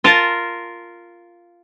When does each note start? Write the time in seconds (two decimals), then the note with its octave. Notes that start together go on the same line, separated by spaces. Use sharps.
0.04 F4 A#4 A5